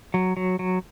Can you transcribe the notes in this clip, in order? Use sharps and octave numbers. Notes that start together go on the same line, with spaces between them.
F#3
F#3
F#3